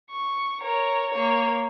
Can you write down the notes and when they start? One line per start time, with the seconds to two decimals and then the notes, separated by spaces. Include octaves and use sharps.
0.11 C#6
0.61 A#4 C#5
1.12 A#3 C#5